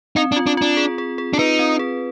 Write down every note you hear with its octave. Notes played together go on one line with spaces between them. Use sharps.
C4 D#4
D4
F4
D4
D4 F4
G#4
G#4
G#4
D4
D#4 B4
C4
G#4